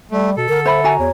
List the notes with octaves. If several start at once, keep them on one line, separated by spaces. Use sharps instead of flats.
G3 A3
B2 A4
D3 A#4
C5 E5 B5
F#4 G#5 A#5
E2 C#5